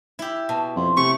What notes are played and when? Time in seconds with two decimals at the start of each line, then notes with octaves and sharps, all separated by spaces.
0.19 E4 G4
0.49 B2 A5
0.76 F2 C6
0.97 C3 A3 C#6